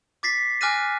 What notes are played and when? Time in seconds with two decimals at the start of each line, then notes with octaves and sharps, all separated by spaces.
0.23 D6 A6 B6 C7
0.61 G#5 D6 F6 F#6 A#6 D#7